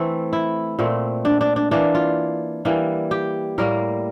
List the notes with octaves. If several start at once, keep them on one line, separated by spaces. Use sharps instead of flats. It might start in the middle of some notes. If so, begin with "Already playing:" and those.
Already playing: E3 A3 C4
E4
A#2 A3 C4
D4
D4
D4
E3 A#3 D4
F4
E3 G3 A#3
G4
A2 G3 A#3 A#4